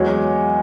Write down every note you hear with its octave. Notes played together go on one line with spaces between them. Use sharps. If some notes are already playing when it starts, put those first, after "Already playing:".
Already playing: E2 F#3 G#3 C#5